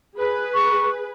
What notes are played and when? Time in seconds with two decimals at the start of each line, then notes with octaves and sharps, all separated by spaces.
0.17 G#4 B4
0.54 C#6